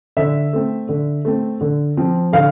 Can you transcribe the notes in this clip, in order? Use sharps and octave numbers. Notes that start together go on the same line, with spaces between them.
D3 E5
A3 C4
D3
A3 C4
D3
F3 C4
D3 F5